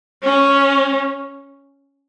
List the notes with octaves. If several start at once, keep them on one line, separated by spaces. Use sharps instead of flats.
C#4